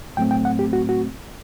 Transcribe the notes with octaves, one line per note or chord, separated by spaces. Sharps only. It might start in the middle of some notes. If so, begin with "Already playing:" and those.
A2 F#3 A3 C4 G5
G5
F#5
G4
F#4
F#4